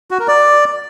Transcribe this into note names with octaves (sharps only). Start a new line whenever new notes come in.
F#4
A#4
D5